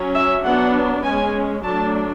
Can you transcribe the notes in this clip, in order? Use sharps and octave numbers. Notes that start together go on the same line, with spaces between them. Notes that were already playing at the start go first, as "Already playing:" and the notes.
Already playing: F#3 C#4
E5
F#3 B3 D4 F#5
G#3 C#4 G#5
F#3 A3 D4 A5